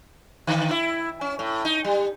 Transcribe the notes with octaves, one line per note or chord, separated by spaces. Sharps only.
D3
E4
C#4
A2
D#4
G3